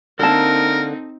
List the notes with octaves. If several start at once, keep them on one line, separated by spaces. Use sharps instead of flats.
D3 A#3 C4 D#4 A4 A#4 A5